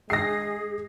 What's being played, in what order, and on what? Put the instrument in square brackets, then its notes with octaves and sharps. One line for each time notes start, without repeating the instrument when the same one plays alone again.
[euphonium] G#3 [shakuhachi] G#4 [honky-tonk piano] A#6 C7